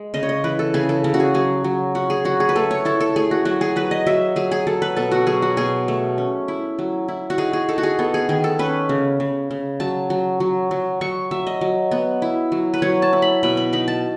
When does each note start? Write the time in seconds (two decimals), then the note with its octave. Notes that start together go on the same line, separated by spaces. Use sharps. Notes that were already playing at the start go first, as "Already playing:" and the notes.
Already playing: G#3
0.14 C#3 D#5
0.23 C#5
0.29 D#5
0.44 E3 B4
0.59 A4
0.74 C#3 G#4
0.89 A4
1.04 C#3
1.14 F#4
1.20 G#4
1.34 F#3 G#4
1.64 F#3
1.95 C#4 F#4
2.10 G#4
2.25 F#3 F#4
2.40 G#4
2.49 B4
2.56 A3 A4
2.71 C#5
2.85 E4 A4
3.01 A4
3.16 A3 G#4
3.31 F#4
3.45 F#3 F#4
3.61 G#4
3.76 F#3 B4
3.91 D#5
4.06 F#3 E5
4.36 F#3 G#4
4.51 G#4
4.67 F#3 A4
4.82 B4
4.96 B2 A4
5.11 F#4
5.27 F#3 G#4
5.42 F#4
5.57 B2 G#4
5.88 A3
6.18 C#4
6.48 E4
6.79 F#3
7.08 E4
7.30 F#4
7.38 D#4 G#4
7.53 G#4
7.69 D#4 A4
7.78 F#4
7.83 G#4
7.99 B3 A4
8.14 G#4
8.29 D#3 G#4
8.44 A4
8.59 C#4 B4
8.89 C#3
9.20 C#3
9.51 C#3
9.80 F#3 A5
10.10 F#3
10.40 F#3
10.71 F#3
11.01 F#3 C#6
11.31 F#3 E5
11.47 D#5
11.61 F#3
11.91 B3
12.22 E4
12.52 F#3
12.74 B4
12.82 F#3 C#5
13.02 A5
13.13 E4
13.22 B5
13.43 B2 B5
13.57 B5
13.73 D#4 B5
13.88 A5